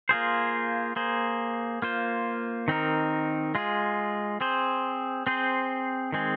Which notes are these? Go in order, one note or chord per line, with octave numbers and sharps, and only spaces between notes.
A#3 F4 G#4 C5
A#3 G#4 C5
A#3 F4 C5
D#3 C4 D#4 A#4
G#3 F4 G#4
C4 G#4 C5
C4 G#4 C5
D#3 G#3 C4 G#4